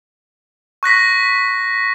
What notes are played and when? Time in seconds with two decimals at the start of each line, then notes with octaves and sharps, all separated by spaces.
0.83 C#6 F#6 A#6 B6